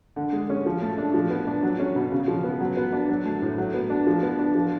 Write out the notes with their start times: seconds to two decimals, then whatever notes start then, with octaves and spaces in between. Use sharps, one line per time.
0.16 D3
0.33 G#3
0.50 C#4
0.66 F3
0.82 A3
0.98 D4
1.14 F3
1.30 B3
1.47 D4
1.63 F#3
1.80 C#4
1.96 B2
2.12 C#3
2.28 F3
2.44 B3
2.61 F#3
2.77 B3
2.93 D4
3.09 F#3
3.25 A3
3.42 A2
3.58 F#3
3.74 B3
3.90 D4
4.07 F3
4.23 B3
4.39 D4
4.55 F3